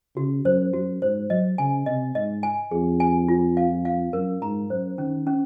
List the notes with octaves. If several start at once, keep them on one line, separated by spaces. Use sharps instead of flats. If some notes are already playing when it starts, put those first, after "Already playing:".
C#3 F#4
F#2 C5
F#2 F#4
G#2 C5
F#3 D#5
C#3 G#5
C3 D#5
G#2 D#5
G#5
F2 G#4
G#5
F4
F5
F5
F#2 A#4
G#2 A#5
F#2 C5
D#3 C#4
C#4